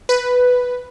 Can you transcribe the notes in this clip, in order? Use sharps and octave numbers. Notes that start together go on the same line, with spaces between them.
B4